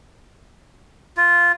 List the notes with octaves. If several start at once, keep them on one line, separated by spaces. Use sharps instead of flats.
F4